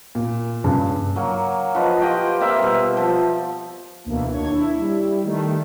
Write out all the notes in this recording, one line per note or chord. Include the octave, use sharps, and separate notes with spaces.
A#2
G2 C#3
F#3 A#3
F3 B4 D#5
F4 G4 D#5 G5
A#3 C4 E5
B2 G3
F3
D2 B2 E3 A#3
D#2 D4 C#5 G#6
E4
G3
D#3 A3